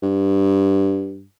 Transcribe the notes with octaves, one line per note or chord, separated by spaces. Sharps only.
G2